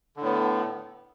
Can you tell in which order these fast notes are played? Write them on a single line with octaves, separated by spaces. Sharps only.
D3 A2 B3